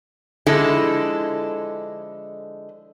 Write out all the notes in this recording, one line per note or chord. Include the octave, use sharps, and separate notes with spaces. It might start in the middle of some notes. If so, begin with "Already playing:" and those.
D3 F3 G#3 E4 A4